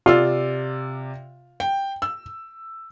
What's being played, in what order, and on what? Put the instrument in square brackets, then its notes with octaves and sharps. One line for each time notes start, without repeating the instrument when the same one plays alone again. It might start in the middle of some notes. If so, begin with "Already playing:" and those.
[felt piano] C3 D5 E6 [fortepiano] F4
[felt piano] G5
E6